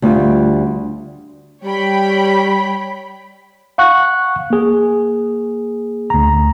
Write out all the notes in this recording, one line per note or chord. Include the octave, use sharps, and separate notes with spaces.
D2 G3 D4 F4
G3 C#5 G5 B5
F5 F#5 C#6 F#6
A#3 G#4
D2 A#5